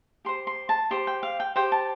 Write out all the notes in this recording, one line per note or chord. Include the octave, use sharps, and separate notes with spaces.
G4 C5 C6
C6
A5
G4 C5 C6
G5
F5
G5
G4 C5 G5
A5